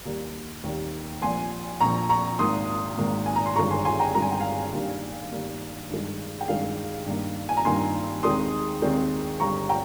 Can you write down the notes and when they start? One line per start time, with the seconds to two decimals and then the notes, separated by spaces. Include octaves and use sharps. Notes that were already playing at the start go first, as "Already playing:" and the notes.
0.05 D#2 D#3 G3 A#3
0.63 D#2 D#3 G3 A#3
1.22 A#1 A#2 F3 G#5 C6
1.81 A#1 A#2 F3 A#5 C#6
2.09 A#5 C#6
2.39 G#1 G#2 D#3 A#3 C6 D#6
2.97 G#1 G#2 D#3 A#3
3.26 G#5
3.36 A#5
3.46 C6
3.56 G1 G2 D#3 G#3 A#5 C#6
3.71 G#5 C6
3.85 G#5 C6
3.99 G5 A#5
4.15 G1 G2 D#3 G#3 A#5
4.22 G#5
4.31 G5
4.39 F5 G#5
4.72 G2 D#3 G3 A#3
5.31 G2 D#3 G3 A#3
5.90 G2 D#3 G#3
6.41 G5
6.48 G2 D#3 G#3 F5
7.06 G2 D#3 A#3
7.49 G#5
7.57 A#5
7.65 G2 D#3 A#3 G#5 C6
8.23 D#2 D#3 G#3 C4 C6 D#6
8.82 D#2 D#3 G#3 C4
9.40 G1 G2 G3 A#5 C#6
9.69 G5 A#5